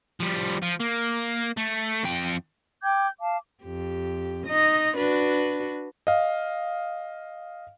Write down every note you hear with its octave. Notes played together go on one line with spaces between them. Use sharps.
F3 G3
F3
A#3
A3
F2 G5
G5 D6 G6 G#6
F5 A5 D6
F2 G4
D#4 D#5
D4 F#4 B4
D#5 F5